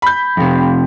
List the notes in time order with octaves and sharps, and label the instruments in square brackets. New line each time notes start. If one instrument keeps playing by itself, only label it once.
[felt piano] B5 G6
[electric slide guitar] F2 C3